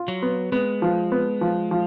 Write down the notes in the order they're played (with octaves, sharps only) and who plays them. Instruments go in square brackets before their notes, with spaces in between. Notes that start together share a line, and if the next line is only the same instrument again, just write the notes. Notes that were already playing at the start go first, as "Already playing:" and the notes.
Already playing: [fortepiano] F4
[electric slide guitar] F#3
[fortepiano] B3
[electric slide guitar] G#3 [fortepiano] B3
[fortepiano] F3
B3
F3
F3